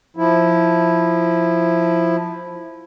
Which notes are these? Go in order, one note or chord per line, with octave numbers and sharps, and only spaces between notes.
F3 E4